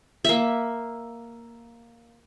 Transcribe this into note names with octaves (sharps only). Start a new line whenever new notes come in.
A#3 E5